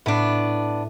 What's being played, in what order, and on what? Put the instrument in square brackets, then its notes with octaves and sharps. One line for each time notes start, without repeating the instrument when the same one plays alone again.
[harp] A2 [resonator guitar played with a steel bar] B3 D4